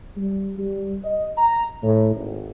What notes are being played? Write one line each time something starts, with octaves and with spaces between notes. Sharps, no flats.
G3
G3
D#5
A#5
A2
G#1